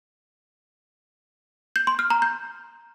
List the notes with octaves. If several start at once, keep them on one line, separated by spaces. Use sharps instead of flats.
G6
C6
F6
A#5
G6